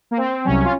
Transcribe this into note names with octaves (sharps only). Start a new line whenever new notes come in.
A#3
C4
C2 C3 F#3 C#4
F4